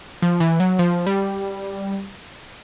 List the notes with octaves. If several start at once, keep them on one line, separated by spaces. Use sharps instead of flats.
F3
E3
F#3
F3
G3